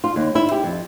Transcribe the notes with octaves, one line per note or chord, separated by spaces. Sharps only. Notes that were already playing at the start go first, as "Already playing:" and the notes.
F4
D#2
E4
G4
F2